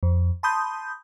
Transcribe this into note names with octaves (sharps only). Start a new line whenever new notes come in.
F2
A5 B5 C6 D#6 G6